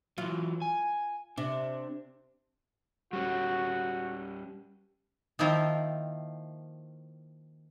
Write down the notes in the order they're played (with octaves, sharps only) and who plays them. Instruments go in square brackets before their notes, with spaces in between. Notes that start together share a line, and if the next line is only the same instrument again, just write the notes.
[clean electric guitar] E3 F#3 [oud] F4
[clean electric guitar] G#5
[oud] C3 [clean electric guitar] D4
[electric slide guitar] G3 C#4 [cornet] F#4
[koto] D#3 F3 A#3 C4 E4 F4